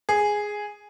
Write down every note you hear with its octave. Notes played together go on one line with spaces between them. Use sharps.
G#4